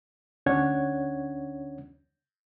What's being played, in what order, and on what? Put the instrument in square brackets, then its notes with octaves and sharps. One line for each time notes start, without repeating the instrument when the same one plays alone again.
[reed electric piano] D2 C#4 D4 C#5 F#5 G#6